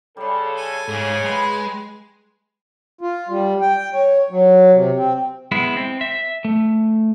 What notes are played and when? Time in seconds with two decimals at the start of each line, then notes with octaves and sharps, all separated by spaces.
0.17 C#3 G3 A4 C6
0.57 G#5
0.88 G#2 C#3
1.24 G#3 B4 G5 B5
3.01 F4
3.29 G3
3.62 G5
3.94 C#5
4.30 F#3
4.73 C3
4.96 C4
5.52 G#3 B3 E4
5.76 C4
6.01 E5
6.45 A3